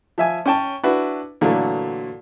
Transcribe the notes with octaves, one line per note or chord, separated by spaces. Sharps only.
F3 E5 G#5
C#4 C#5 G5 A5
D4 E4 F#4 B4
A#2 D3 E3 F#3 A3